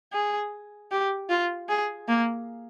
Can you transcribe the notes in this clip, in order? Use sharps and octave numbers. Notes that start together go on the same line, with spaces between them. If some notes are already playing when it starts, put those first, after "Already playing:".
G#4
G4
F4
G#4
A#3